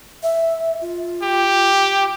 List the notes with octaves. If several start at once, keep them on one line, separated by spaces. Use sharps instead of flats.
E5
F4
G4